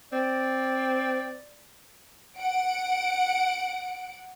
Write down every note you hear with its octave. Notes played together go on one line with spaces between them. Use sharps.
C4 D5
F#5 D7